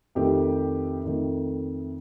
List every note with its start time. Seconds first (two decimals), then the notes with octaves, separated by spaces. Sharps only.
0.15 F2 D#3 A3 G4
1.04 F2 D#3 A3